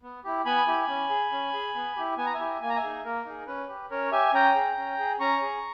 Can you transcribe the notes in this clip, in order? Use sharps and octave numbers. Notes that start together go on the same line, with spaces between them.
B3
E4 G4
B3 G#5 B5
E4 G4
C#4
G#4
C#4
G#4
B3
E4 G4
B3 G#5
A#5
E5 G#5
E4 G4
A#3 G#5
A#5
E5 G#5
D#4 G#4
A#3 A#4
D#4 G#4
C#4 B4
G4
C#4 A#4 C#5
G4 E5 G#5
C#4 G5 A#5
G#4
C#4
G#4
C#4 A#5 C#6
G#4